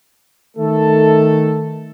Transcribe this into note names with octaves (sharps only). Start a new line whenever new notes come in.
D#3 A3 A4